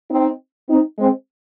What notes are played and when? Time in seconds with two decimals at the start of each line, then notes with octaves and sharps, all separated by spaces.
0.10 C4 D#4
0.69 C4 D#4
0.98 G#3 C4